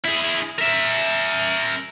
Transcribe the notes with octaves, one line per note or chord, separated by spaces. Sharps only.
E4 G#4
A#4 E5